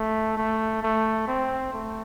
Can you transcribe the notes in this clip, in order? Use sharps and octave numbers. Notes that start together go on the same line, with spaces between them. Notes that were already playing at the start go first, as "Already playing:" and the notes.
Already playing: A3
A3
A3
C4
A3